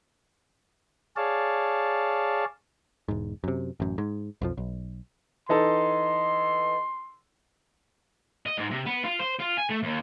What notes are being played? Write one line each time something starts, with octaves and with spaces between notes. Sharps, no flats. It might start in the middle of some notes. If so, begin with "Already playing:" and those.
G#4 C#5 D5 F5 A5
E1 G#2
F#2 C3
A1 F#2
G#2
B1 F2 F3
B1
E3 D#4 A4 C6
D#5
G#2
C3
B3
F4
C5
F4
G#5
A3
D#2